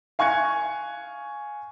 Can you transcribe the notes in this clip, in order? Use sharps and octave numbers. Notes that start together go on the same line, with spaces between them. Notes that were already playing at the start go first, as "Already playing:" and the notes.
F5 G#5 C#6 F#6 G#6 C#7